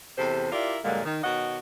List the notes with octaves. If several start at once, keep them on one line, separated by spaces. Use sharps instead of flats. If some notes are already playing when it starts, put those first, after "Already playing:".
E2 C3 G4 A4 C5
E4 F4 G4 A#4 D5
G2 A#2 D3 F#3 G#3 A#3
D#3
B2 D#3 C#5 D#5 F#5